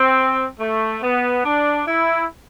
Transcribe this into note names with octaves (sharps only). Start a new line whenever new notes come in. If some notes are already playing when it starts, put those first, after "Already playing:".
Already playing: C4
A3
B3
D4
E4